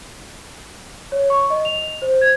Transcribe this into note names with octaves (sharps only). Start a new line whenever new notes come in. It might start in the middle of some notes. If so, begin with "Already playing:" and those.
C#5
C#6
D#5
F7
C5
G#6